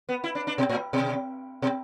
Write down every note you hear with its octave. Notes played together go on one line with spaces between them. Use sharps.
B3
E4
D4
D4
B2
A2
B2
B2